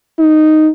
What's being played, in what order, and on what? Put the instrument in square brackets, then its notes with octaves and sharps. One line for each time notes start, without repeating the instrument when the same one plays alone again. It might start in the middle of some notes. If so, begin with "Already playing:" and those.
[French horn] D#4